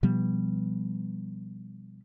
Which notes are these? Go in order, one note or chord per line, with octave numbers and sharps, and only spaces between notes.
B2 F3 G3 B3